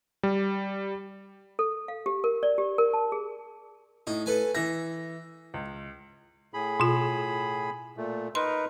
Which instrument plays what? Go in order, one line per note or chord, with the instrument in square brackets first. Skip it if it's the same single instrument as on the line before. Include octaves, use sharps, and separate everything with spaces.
[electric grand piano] G3
[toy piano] A4
F5
G4
A#4
D5
G4
A#4
A5
G#4
[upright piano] A2 [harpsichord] D#4
[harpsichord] A4 B4 G#5
[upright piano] E3 A#6 [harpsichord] E5
[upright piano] C#2
[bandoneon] A2 G#4 B5
[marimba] B2 F4
[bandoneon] A#2 A3
[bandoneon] D#4 A#4 B4 [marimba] C6